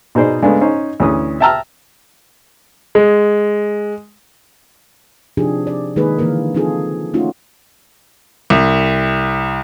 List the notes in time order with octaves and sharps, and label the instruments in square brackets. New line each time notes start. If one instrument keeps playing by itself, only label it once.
[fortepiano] B2 D#4 G#4 C5 D5
C#3 G#3 A3 B3 D4
C#4 D#4 C5
D2 E3 C#4 D#6
E5 G5 A5 A#5 E6 F6
[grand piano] G#3
[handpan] C3 F3 D4 D#4 G4 G#4
D5
D#3 G#3 A#3 D#4 G#4 B4
D3 E3 G#3 A#3 A#4
F3 C4 D#4 F4 G#4 A4
A3 C#4 D#4 F4 F#4
[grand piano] C2